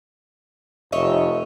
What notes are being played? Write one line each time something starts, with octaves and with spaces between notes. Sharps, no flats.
F1 C#5 D#5 E5